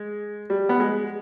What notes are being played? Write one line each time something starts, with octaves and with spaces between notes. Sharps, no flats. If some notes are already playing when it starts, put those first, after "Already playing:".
Already playing: G#3
G3
B3
G#3